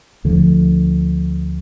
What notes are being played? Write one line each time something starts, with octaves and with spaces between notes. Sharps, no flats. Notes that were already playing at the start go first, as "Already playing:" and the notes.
D2 D3 F3